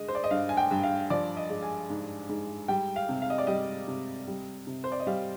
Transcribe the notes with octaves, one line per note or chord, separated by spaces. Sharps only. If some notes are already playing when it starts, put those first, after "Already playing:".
Already playing: D3 G#3 D#5
C5
D5
D#5
G2 F5
G#5
G5
G2
F5
F3 D5
D#5
G#3
G#5
G#2
G#2
G3 G5
F5
C3
F5
D#5
D5
G3 D#5
C3
G3
C3
C5
D5
D#5
G3 F5